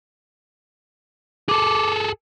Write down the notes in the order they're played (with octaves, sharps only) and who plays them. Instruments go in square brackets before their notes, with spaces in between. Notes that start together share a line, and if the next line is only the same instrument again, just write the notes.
[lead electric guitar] G#4 A4 [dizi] D6